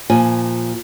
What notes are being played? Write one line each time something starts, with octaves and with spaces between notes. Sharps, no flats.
A#2 F3 G#5